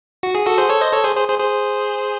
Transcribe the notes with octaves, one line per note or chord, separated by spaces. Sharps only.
F#4
G#4
F#4 A4
G#4 C5
A4 C#5
C5 D#5
A4 C#5
G#4 C5
G#4 C5
G#4 C5
G#4 C5